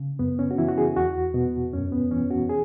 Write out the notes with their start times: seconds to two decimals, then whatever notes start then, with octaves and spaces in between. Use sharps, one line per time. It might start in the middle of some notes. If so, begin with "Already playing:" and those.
Already playing: C#3
0.19 F#2 B3
0.39 C#4
0.51 F#4
0.58 E3 E4
0.69 F#4
0.78 G#4
0.96 E2 F#4
1.34 B2
1.73 F#2 C#4
1.92 B3
2.11 E3 C#4
2.30 F#4
2.49 G#4